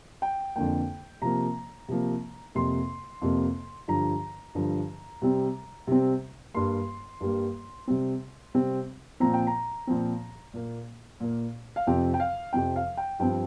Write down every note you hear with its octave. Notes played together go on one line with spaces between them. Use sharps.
G5
F2 D3 A#3 G5
C3 F3 A#3 A#5
C3 F3 A#3
F2 C3 A#3 C6
F2 C3 A#3
G2 D3 F3 A#5
G2 D3 F3
C3 G3 C4
C3 G3 C4
G2 G3 A#3 C6
G2 G3 A#3
C3 G3 C4
C3 G3 C4
A#2 F3 C4 A#5
G5
A#5
A#2 F3 C4
A#2 A#3
A#2 A#3
F5
F2 C3 F3 C4 G5
G5
F5
F2 C3 F3 C4 G5
F5
G5
G2 F3 C4 G5